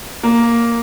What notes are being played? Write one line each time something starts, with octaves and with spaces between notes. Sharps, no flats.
A#3